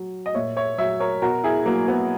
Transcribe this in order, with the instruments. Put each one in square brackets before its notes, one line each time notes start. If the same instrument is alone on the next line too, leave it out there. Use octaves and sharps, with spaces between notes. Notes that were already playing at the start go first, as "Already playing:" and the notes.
Already playing: [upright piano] F#3
D#5
A#2 C#5 E5
C#5 E5
F#3 C#5 E5
A#4 C#5
B2 F#4 A#4
E4 G#4
F#3 A#3
B3